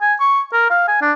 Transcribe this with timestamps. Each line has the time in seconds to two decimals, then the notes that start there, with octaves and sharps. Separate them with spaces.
0.01 G#5
0.20 C#6
0.53 A#4
0.70 F5
0.88 G#5
1.02 D4